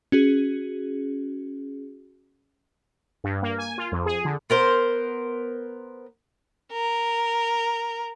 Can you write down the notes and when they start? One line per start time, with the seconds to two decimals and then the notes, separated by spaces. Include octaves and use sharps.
0.12 C#4 F#4 G#4
3.24 G2
3.43 A#3
3.58 G#5
3.78 F4
3.92 F2
4.06 G#4
4.25 D3
4.50 B3 A#4 C5
6.73 A#4